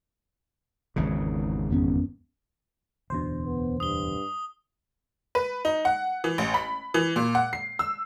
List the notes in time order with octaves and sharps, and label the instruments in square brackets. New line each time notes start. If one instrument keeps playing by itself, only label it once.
[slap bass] G#1 E2 C#3
[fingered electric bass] F2 B3 C#4
[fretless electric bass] D1 E2 D4 [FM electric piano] B2 C5
[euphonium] B3
[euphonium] G2 [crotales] D#6 G7
[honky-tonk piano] B4
D#4
F#5
E3
A1
B5
E3
A#2
F#5
C7
E6